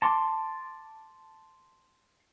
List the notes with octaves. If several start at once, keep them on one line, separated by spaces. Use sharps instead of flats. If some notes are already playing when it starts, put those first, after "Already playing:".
A5 C6 D6